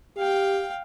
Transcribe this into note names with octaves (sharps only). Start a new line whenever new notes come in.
G4 F5 G5